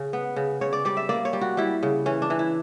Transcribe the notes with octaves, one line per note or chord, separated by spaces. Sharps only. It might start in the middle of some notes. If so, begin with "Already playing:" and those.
Already playing: C#3
B3
C#3
C#3 C#5
D5
G3 D5
E5
A#3 D5
C#5
G3
F#4
G3 E4
C#3
E3 C#4
D4
E3
E4